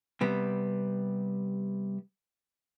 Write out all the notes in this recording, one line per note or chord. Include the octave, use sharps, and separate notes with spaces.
C3 G3 B3